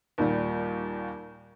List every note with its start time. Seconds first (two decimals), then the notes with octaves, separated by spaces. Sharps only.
0.18 D#2 A#2 G3